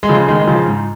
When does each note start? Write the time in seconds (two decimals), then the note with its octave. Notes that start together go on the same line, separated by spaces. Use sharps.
0.03 G#3
0.09 C#3 F3
0.28 D#3 G#3
0.39 G#3
0.47 C#3 F3
0.66 G#2